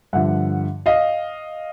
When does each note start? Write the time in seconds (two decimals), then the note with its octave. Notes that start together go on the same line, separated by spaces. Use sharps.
0.13 G2 D3 F3 E5 F#5
0.86 D#5 F5